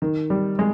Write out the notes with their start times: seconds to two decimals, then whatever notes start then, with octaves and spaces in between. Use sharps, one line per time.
0.02 D#3
0.30 G3
0.59 G#3